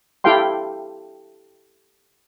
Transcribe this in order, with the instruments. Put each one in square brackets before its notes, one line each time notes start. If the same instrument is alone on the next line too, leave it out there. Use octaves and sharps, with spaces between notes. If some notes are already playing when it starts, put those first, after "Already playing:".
[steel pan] E4 G4 A4 F5 G5 C6